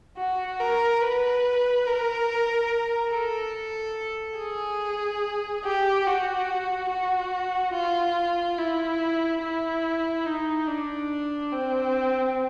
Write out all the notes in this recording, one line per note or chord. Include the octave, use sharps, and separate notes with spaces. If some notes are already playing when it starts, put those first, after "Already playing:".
F#4
A#4
B4
A#4
A4
G#4
G4
F#4
F#4
F4
E4
E4
D#4
D4
C4